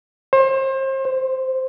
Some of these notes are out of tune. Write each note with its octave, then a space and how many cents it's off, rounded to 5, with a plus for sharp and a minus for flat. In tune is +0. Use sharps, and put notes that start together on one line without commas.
C5 +35
C5 -5